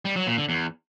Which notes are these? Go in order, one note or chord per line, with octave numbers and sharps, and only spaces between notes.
G3
F#3
A#2
D3
E2